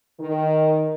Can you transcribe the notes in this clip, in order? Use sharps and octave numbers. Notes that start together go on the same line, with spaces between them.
D#3